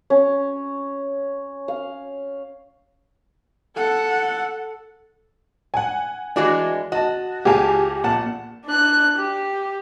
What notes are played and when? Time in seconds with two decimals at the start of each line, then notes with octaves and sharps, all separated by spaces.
0.10 C#4
1.68 F5
3.76 A4 F#5
5.74 F#5 G#5
6.36 E3 G#3 D4 F#4 D5
6.92 F#4 D#5 A5
7.45 C#2 C#3 G4 F5 G#5 A5
8.04 A#1 F#5 A5
8.65 D4 F#6
9.18 G4